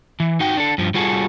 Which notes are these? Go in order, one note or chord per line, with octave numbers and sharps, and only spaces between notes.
E3
D#4 F#4 G5
D4 A4
G2 F3
G3 F4 F#4 G#4 A4